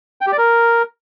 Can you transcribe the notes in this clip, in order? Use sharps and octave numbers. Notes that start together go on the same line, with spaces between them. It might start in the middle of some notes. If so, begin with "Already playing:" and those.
G5
G4
D5
A#4